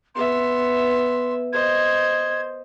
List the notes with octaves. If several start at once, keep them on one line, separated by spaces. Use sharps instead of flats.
B3 E5 C6
C5 D#5 G#6